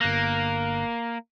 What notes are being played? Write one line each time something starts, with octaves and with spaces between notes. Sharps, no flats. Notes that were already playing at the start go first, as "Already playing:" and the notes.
G1 A#3 F#6 A#6